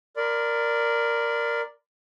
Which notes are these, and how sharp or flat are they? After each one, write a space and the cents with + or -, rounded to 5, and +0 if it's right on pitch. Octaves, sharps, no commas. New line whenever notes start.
A#4 +0 D5 +0 B5 +40